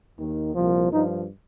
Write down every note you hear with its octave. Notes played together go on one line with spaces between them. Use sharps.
D#2 D#3
C2 A#2 F3
G2 F3 D#4